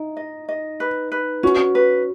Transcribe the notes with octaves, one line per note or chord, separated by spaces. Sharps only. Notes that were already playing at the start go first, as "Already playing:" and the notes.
Already playing: D#4 E4
D#5
D#5
B4
B4
C#4 F#4
B4